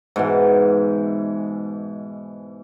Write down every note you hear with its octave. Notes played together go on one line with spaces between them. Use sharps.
G#2 B2 E3